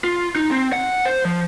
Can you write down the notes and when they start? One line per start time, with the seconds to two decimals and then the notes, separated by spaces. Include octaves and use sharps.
0.04 F4
0.36 D#4
0.51 C4
0.73 F#5
1.06 C5
1.25 F3